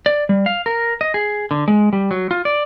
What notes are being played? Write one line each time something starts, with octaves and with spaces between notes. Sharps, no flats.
D5
G3
F5
A#4
D#5
G#4
D3
G#3
G3
F#3
F4
D5